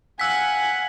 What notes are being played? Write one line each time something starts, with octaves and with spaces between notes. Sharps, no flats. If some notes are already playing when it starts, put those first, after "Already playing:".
F5 F#5 G#5 E6 B6